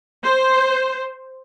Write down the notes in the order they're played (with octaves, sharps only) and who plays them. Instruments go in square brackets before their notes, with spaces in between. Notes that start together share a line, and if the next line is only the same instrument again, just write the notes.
[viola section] C5